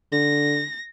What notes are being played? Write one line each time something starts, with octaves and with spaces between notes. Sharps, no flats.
D3 A#6